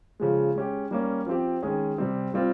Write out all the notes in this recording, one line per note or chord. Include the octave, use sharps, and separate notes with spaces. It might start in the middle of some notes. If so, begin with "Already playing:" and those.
C#3 F3 G#3
G#3 C#4 G4
G3 A#3 C#4
F3 C4 G4
D#3 G#3 C#4 G#4
C3 G3 C4
G3 C4 F4